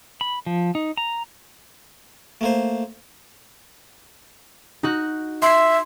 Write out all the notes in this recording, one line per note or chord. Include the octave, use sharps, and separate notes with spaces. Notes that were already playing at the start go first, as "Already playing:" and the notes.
B5
F3
D#4
A#5
A3 A#3 C5
D#4 F#4 F#6
E5 C6 C7